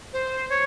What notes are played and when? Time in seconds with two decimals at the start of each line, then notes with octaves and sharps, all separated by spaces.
0.13 C5
0.49 C#5